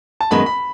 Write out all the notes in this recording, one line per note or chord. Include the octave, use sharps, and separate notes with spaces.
A5
F#2 D#3 G#3 B3 B5
B5